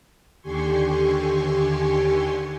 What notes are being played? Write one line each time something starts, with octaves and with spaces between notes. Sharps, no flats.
D#2 D3 G4 G#5 C6 C#6